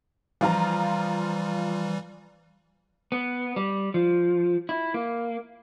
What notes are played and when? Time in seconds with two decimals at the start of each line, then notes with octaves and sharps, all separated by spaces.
0.41 E3 F3 G3 F4 A#5
3.12 B3
3.56 G3
3.94 F3
4.69 E4
4.94 A#3